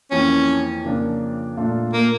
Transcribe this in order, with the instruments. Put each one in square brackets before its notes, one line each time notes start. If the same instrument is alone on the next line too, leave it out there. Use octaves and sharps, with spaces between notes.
[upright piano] F2 E3 A#3 [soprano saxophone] C#4
[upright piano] F2 C#3 F3 A#3 D4
A#2 A3 D4 F4 A4
[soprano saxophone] A#3